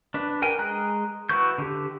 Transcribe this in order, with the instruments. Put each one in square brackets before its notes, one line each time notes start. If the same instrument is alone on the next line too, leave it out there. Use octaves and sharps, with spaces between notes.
[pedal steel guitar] D4 B4
A#4 G5 G#5
G#3 A#5 F#6
E4 F#4 B4 C#6 G6
D3 G4